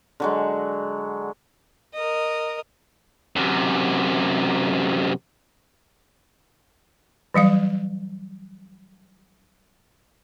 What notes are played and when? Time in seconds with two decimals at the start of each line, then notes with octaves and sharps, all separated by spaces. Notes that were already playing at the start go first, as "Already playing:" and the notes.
0.20 D3 F#3 G#3
1.94 A#4 D#5
3.36 F#2 C3
7.34 E3 F#3 G3 F5